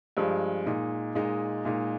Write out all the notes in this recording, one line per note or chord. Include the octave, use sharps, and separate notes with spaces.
G2 F3 G#3
A#2 G#3 D#4
A#2 G#3 D#4
A#2 G#3 D#4